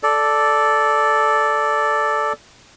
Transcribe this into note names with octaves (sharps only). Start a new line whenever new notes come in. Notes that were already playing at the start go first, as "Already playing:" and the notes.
A4 D5